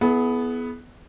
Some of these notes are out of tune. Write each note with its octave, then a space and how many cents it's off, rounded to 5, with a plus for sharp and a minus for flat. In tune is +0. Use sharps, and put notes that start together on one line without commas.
B3 +0 E4 +0 G#4 +35